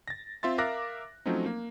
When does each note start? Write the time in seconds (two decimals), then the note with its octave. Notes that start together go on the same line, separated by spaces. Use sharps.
0.08 A6 A#6
0.43 C4 F4 E5 C6 A6
0.58 A#4 E5 F5 D6 F#6 A#6
1.26 F3 F#3 A3 C4 C#4 D#4
1.46 A#3